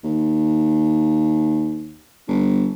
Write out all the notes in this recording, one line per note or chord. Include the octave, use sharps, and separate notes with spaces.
D#2
G1